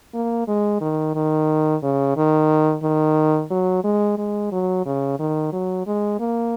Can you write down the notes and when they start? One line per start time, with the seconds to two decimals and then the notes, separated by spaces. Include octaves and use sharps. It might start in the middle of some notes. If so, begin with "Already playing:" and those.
0.14 A#3
0.48 G#3
0.81 D#3
1.15 D#3
1.83 C#3
2.17 D#3
2.83 D#3
3.51 F#3
3.84 G#3
4.18 G#3
4.52 F#3
4.86 C#3
5.19 D#3
5.52 F#3
5.87 G#3
6.20 A#3